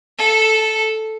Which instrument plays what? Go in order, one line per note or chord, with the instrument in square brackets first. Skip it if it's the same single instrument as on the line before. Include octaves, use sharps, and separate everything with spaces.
[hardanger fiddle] A4